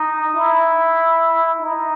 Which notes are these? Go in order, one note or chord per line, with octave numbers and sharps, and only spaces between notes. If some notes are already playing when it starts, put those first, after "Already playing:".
Already playing: D#4
E4
D#4